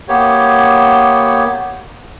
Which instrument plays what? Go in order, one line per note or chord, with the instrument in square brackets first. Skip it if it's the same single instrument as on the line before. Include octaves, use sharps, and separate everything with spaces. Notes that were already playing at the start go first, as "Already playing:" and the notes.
[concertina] A#3 B3 G4 C#5